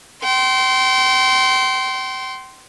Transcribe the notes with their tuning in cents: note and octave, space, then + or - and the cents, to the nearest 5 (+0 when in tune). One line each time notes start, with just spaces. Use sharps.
G5 -35 C6 +0